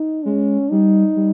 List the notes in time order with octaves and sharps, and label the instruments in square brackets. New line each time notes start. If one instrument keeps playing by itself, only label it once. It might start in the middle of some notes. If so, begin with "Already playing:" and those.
Already playing: [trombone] D#4
[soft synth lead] G#3 [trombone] C#4
[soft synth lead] G3 [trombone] D#4
[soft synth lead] G3